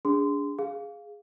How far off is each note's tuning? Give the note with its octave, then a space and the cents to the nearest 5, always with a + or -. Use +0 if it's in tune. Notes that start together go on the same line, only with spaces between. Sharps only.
D4 -25 G#4 -20 C6 -20
G#4 +0 F5 +0